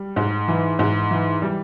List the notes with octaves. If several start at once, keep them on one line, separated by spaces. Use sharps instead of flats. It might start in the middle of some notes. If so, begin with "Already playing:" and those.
Already playing: G3
G#2
E3
G#2
E3
G3